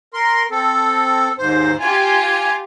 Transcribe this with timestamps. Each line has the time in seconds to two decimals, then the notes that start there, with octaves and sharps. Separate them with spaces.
0.14 A#4 C6
0.51 C4 A4
1.38 D#2 G#2 C5
1.80 F4 G4 G#5